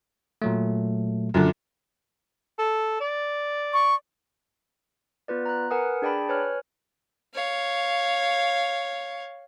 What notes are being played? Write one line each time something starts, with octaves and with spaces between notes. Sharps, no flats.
A#2 F#3 A3
F#2 A#2 D3
A4
D5
C#6
B3 F4 B4 D5
A#5 F#6
A#4 B4 F#5 G#5 D#6
D4 G#4 D5 G5 A5 B5
B4 C#5 G#5 F6
C#5 F5